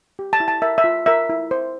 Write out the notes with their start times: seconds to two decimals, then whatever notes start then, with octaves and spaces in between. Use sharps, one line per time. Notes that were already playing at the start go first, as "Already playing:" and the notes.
0.19 G4
0.33 A5
0.40 E4
0.48 A5
0.62 A#4 E5
0.78 E5
0.84 F4
1.06 A#4 E5
1.29 E4
1.51 C5